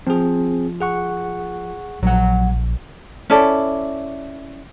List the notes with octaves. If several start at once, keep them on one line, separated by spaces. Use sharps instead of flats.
F3 C4 G#4
G#4 F#5 C#6
A#1 F#3 F#5
C#4 E4 A4 D5